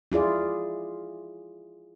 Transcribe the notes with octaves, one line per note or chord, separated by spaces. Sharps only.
E4 F4 G#4 D5